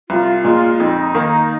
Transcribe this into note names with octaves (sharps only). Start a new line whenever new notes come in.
C2 F4
A#2 G#3 F4
F2 D#4
D#3 A#3